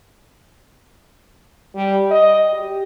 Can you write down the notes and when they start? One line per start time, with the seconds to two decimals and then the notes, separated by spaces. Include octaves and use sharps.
1.75 G3
2.11 D#5
2.53 G4